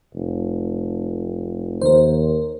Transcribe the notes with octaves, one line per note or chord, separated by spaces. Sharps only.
F1
D#2 A#4 C5